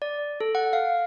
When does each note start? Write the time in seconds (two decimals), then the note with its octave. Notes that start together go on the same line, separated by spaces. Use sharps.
0.02 D5
0.40 A4
0.55 F#5
0.73 F5